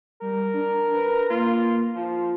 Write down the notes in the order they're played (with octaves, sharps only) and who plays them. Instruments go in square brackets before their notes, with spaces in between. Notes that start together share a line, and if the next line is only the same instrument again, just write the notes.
[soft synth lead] G3 [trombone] A#4
[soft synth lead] D4
B4
[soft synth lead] A#3 [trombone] F4
[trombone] F3 [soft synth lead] F4